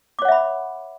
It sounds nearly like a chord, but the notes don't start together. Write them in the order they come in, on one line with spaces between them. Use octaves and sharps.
D6 C#5 F#5 E5 B5